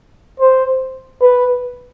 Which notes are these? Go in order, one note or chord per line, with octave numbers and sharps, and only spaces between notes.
C5
B4